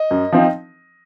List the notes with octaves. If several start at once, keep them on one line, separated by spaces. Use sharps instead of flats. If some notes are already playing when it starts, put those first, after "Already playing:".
Already playing: D#5
F#2
F3 C4 D#4